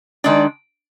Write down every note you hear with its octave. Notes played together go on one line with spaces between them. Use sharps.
D#3 G#3 D4 D5